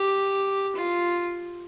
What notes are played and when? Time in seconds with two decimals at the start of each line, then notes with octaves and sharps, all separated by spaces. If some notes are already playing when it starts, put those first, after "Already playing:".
Already playing: G4
0.76 F4